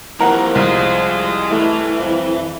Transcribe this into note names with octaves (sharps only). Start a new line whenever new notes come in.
E3 F3 A#3 A#4 F#5
C2 G#4 D#5
E3 A3
F2